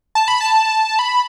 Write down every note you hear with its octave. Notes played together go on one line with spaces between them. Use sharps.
A5
B5
A5
B5